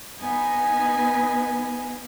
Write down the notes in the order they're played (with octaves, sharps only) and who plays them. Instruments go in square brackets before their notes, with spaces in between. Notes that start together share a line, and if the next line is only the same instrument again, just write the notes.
[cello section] B3 D#4 [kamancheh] G#5